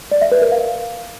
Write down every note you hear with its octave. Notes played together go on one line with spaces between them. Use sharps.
D5
E5
B4
A#4
F5